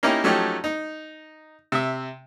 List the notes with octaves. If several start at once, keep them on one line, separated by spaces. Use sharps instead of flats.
A#3 C#4 D#4 E4 G4 A#4
F3 F#3 A3 C#4 D#4 G4
D#4
C3 E5